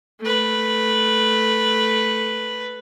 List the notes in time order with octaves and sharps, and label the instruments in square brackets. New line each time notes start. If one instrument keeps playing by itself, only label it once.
[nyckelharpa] A3 B4